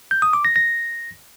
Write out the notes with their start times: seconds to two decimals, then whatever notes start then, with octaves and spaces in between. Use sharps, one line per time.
0.11 G6
0.22 D#6
0.33 D6
0.45 A#6
0.56 A#6